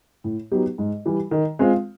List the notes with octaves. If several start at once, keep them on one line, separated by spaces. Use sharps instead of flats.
A2
F#3 B3 D#4 G4
G#2
E3 G3
D#3
G#3 C4 F4